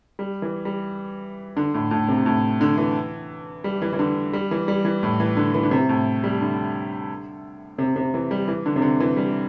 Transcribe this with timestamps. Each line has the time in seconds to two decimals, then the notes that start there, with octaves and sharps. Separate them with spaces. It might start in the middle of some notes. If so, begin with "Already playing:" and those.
0.19 G3
0.42 E3
0.65 G3
1.57 D3
1.74 A2
1.91 A2
2.08 C3
2.26 A2
2.61 D3
2.78 E3
3.64 G3
3.82 E3
3.93 E3
3.99 D3
4.33 G3
4.51 E3
4.68 G3
4.85 E3
5.03 A2
5.20 E3
5.37 D3
5.55 E3
5.63 D3
5.71 C3
5.89 A2
6.24 G3
6.41 D3
7.78 C3
7.96 C3
8.14 E3
8.31 G3
8.48 E3
8.66 D3
8.76 C3
8.82 D3
9.00 E3
9.17 G3